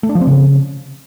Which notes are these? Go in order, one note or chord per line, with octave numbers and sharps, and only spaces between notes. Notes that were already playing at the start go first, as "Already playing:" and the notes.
A3
D4
F3
C4
C#3